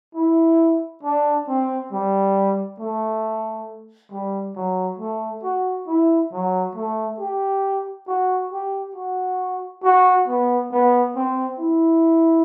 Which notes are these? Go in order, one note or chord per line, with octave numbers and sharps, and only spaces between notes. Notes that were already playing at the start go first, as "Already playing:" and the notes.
E4
D4
C4
G3
A3
G3
F#3
A3
F#4
E4
F#3
A3
G4
F#4
G4
F#4
F#4
B3
B3
C4
E4